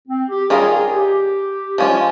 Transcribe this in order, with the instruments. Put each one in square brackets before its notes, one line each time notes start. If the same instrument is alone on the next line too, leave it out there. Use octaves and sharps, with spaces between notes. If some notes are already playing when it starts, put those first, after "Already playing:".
[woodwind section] C4
G4
[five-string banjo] D#3 G3 C#4 F4 A#4 [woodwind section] G#4
[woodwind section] G#4
G4
[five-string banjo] F3 G#3 C#4 F4